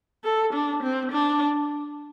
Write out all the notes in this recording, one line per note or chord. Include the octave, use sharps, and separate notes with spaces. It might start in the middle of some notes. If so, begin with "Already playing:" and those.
A4
D4
C4
D4